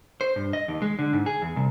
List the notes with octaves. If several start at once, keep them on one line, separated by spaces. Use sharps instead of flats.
C5
G2
D#5
D#2
G#3
D3
G#2
G#4
E2
C2